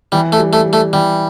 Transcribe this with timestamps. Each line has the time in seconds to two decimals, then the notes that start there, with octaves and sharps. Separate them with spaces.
0.12 E3 G3
0.32 A3
0.39 G3
0.53 A3
0.66 G3
0.73 A3
0.93 E3 G3